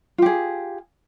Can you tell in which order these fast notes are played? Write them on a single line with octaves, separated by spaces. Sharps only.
F4 G4 G#4